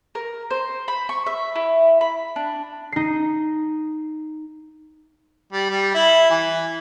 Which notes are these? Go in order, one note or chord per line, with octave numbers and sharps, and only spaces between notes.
A#4
C5
B5
C#6
E5
E4
B5
D4
D#4 C7
G3
G3
E4
E3